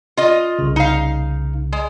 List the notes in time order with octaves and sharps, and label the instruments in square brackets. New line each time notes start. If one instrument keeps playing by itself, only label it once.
[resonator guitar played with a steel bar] F4 D#5
[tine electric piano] C2 C#3
[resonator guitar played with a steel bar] D#4 F5
G#3